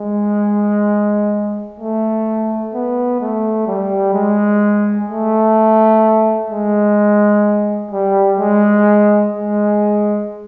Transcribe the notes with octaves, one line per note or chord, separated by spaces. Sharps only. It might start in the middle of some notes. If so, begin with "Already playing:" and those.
Already playing: G#3
A3
B3
A3
G3
G#3
A3
G#3
G3
G#3
G#3